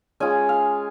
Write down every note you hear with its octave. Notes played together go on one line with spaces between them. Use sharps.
G#3 C#4 F4 G#5
F5